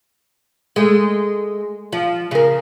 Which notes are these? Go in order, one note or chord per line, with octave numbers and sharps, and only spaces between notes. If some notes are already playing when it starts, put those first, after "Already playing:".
G#3 A3
F3
C#3 A#4